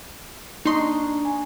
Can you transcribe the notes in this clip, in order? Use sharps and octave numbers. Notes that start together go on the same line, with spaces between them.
A#3 D4 D#4 A#5 C6 C#6
G#5